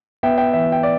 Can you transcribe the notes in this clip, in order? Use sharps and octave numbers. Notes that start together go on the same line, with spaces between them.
B3 E5 G5
E5 G5
E3 E5
G5
D5